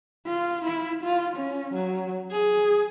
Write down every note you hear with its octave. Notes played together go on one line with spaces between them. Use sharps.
F4
E4
F4
C#4
F#3
G#4